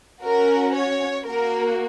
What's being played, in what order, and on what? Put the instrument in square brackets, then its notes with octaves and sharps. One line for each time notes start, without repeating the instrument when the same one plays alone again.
[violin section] C#4 F#4 A#4
C#5
A#3 F#4 A#4